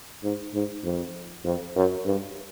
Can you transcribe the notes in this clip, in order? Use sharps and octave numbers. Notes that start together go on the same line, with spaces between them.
G#2
G#2
F2
F2
F#2
G2